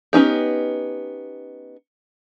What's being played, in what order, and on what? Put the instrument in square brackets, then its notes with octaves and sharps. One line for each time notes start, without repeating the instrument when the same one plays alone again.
[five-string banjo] B3 C#4 D#4 G4